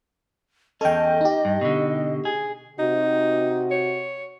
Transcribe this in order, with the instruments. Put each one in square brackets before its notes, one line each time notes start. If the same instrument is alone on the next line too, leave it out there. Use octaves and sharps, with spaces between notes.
[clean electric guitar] E2 C#4 [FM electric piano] A4 G5 [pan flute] D#5
[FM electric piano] D#4 G4
[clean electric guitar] G2
B2 D3
G#4
[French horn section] C3 F#4 [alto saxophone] D#4
[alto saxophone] C#5